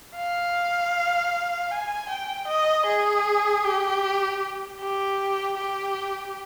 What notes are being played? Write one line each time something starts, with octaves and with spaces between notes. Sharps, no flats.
F5
G#5
G5
D#5
G#4
G4
G4
G4